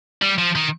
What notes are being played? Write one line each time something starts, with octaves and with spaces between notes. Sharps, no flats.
G3
F3
D#3